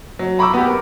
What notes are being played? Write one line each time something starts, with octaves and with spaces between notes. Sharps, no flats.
F#3
A#5 B5 C#6 D6 E6
B3 G4
A#4